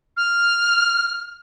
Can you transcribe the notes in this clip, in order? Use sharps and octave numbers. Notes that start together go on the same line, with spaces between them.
F6